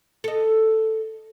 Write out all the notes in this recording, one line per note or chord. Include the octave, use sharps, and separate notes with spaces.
A4 D#5